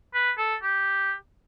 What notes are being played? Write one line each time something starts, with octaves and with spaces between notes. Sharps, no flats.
B4
A4
G4